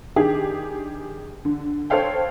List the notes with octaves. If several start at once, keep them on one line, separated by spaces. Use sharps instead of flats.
D#3 D4 G4 G#4
D3
A4 C5 C#5 F5 G5